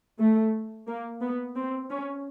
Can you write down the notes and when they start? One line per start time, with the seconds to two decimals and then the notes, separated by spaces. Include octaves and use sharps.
0.19 A3
0.87 A#3
1.21 B3
1.56 C4
1.90 C#4